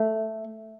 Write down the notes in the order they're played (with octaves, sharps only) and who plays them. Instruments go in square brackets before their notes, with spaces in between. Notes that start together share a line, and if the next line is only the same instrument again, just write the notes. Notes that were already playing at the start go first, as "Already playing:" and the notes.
Already playing: [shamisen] A3